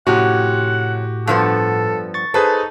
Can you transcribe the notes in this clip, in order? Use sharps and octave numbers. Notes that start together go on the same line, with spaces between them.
A2 C3 F3 C#4 F#4 G4 F#5
G2 F3 B3 A4
C#6 A6
D#4 G#4 A4 B4 C5